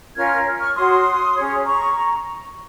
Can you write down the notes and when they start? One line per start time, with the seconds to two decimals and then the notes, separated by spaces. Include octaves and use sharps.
0.15 C#4 F4 A#4 C#5 F6 G#6
0.60 C#6 F6
0.75 F#4 C#5 C6 D#6
1.35 C#4 G#4 C#5
1.65 A#5 C#6